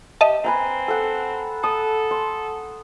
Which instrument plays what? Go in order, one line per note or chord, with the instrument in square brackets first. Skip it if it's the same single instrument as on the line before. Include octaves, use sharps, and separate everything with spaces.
[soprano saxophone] G4 [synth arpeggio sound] D#5 E5 A5
[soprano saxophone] C4 [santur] B4 G#5 A#5
[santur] A4 F#5
[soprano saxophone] A4 [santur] D#6
[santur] C6